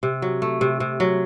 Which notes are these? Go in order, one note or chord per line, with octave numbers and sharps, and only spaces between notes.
C3
F#3
A3
C3
C3
F#3